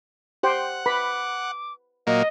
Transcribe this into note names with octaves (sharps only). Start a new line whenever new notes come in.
G4 C5 F#5 G5
B4 B5 D6
A#2 F#3 A#3 D#5